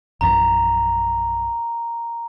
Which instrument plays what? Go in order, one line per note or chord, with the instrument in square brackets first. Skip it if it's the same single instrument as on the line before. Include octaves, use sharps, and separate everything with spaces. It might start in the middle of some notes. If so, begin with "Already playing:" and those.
[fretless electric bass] A#1 F#2 E3 [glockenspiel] A#5